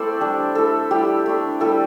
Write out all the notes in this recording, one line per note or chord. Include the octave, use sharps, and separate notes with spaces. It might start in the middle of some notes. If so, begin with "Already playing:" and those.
Already playing: A3 C4 E4 A4 C5 D5
G3 D4
A3 E4 A4
G3 E4 G4
A3 D4
G3 E4 A4